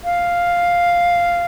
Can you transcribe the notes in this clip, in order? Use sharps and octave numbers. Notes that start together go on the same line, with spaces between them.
F5